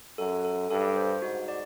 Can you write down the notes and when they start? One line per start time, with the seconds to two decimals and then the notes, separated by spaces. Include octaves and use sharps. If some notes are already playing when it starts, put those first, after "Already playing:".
0.18 F#2 A4
0.44 A4
0.70 G2 A4
0.96 C5
1.22 G#2 F#4
1.48 D5